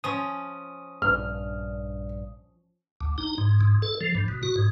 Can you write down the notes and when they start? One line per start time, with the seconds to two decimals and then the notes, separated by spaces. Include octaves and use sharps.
0.04 F3 C#4 D#6
1.02 A#1 G2 F6
3.01 D2
3.18 D#4
3.38 G#2
3.61 G#2
3.82 A4
4.01 F3
4.15 G2
4.28 B2
4.43 F#4
4.56 G#2